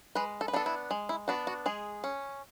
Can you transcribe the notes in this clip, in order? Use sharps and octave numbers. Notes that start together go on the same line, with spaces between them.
G#3 B4
A4
B4
B3 D4 A4
E4
G#3
E4
B3 D4 F#4
F#4
G#3 G#4
C#4